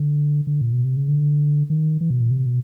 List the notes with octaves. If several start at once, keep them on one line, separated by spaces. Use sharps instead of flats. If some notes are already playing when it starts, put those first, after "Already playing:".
Already playing: D3
D3
A#2
B2
C3
C#3
D3
D#3
E3
B2
A#2
C3
B2